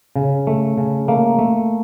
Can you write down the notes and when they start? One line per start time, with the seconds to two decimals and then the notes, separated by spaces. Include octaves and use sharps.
0.16 C#3
0.47 A3
0.78 C#3
1.08 A3 A#3
1.39 A3